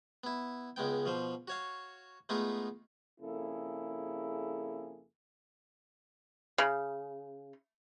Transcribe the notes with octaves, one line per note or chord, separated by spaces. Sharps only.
B3 E4
C#2 G#3 B3 G5
B2 F3 C5
F#4 C#5 F5
G#3 A3 B3 D#4 F4
F2 C#3 A#3 E4 G#4 A4
C#3